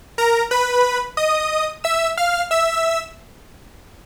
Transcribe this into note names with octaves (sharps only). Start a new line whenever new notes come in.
A#4 A#5
B4 B5
D#5 D#6
E5 E6
F5 F6
E5 E6